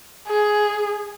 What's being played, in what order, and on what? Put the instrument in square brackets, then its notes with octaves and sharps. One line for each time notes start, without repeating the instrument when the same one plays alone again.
[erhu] G#4